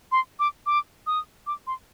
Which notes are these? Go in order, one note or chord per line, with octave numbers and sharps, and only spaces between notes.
C6
D6
D6
D#6
D6
C6